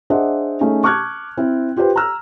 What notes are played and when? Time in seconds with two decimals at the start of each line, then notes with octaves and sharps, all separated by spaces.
0.10 D4 G#4 C5 D#5 E5 F#5
0.60 A3 C#4 D#4 G#4
0.83 A5 C#6 D6 F6 F#6 G#6
1.37 C4 E4
1.76 F4 G4 B4 C5 G5
1.96 A#5 E6 F6